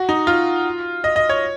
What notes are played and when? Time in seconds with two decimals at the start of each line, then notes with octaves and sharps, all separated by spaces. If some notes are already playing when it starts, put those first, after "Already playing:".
Already playing: F#4
0.09 D#4
0.27 F4
1.04 D#5
1.16 D#5
1.29 C#5